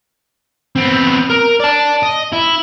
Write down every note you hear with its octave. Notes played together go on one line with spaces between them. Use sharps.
B3 C4
A#4
D5 A5
D#5
E4